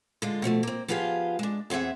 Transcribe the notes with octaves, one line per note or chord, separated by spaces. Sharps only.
D3 G#3 F4
B2 F3 F#3 A3
A#3 C4
F3 B3 F4 G4 G#4 F5
G#3 D4
E2 C4 G#4 E5 F#5